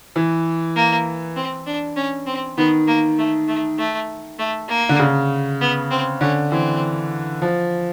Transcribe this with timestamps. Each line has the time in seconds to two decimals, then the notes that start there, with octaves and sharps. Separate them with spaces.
0.16 E3
0.76 A#3
1.36 C4
1.66 D4
1.96 C#4
2.27 C4
2.58 D#3 B3
2.88 A#3
3.18 A3
3.48 A3
3.79 A3
4.39 A3
4.69 A#3
4.89 D3
4.99 C#3
5.61 B3
5.91 C4
6.21 D3 C#4
6.51 E3 C4
7.42 F3